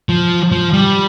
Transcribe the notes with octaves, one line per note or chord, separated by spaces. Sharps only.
F3
F3
G3